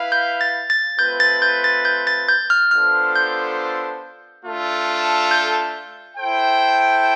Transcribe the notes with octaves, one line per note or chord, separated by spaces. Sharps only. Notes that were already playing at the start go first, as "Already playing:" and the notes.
Already playing: E4 B4 F5
G6
A6
A6
A3 C4 F4 B4 G6
A6
G6
A6
G6
A6
G6
F6
B3 D4 F4 A4 C5 F6
G6
A3 D4 F4 A4
G6
E4 A4 C5 G5